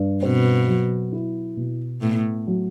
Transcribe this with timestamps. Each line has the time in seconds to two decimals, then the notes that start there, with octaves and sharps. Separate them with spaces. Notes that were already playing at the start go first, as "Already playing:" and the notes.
Already playing: G2
0.23 B2 C4
0.67 F#3
1.12 E4
1.57 B2
2.02 A2 B3
2.47 F#3